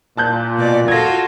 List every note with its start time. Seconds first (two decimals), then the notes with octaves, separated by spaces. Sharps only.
0.17 A#2 A5 F#6 G6
0.59 B2 D5
0.88 F4 F#4 A4 G#6 A#6